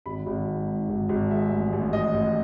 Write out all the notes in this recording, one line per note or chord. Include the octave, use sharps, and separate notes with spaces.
G#1 B5
G#1
G#2
G#2
G#1
G#1
G#3 E5
A1
A1
A1 D#5
A1